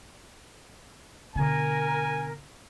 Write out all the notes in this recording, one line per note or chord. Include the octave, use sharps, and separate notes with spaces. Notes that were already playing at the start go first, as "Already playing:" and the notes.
B2 D3 A#4 G#5